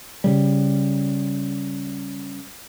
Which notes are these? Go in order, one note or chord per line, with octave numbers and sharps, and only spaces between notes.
C#3 G3